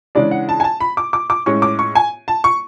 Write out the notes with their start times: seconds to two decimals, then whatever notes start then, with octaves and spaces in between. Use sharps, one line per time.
0.15 C#3 E3 G#3 D4 D5
0.31 F#5
0.49 A5
0.60 G#5
0.64 A5
0.80 B5
0.97 D6
1.13 D6
1.30 D6
1.46 A2 G#3 C#4 C#6
1.62 D6
1.79 C#6
1.95 G#5
2.28 A5
2.44 C#6